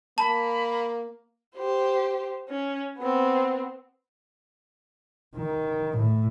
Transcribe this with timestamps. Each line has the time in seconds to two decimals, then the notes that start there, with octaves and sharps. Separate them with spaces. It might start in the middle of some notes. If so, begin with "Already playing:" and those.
0.18 A#3 A5 B5
1.56 G4 C5
2.49 C#4
2.98 B3 C4
5.36 D#3
5.97 A2